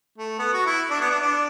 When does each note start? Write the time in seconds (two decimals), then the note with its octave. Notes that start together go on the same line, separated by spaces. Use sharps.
0.18 A3
0.39 B3
0.53 F#4
0.66 E4
0.90 D4
1.01 B3
1.11 D4
1.21 D4